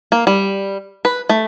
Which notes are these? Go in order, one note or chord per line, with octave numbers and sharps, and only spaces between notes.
A#3
G3
B4
A3